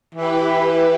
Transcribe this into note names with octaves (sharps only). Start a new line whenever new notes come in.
E3 E4 G4 B4